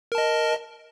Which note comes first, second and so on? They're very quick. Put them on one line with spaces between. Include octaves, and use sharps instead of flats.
A#4 A5 D#5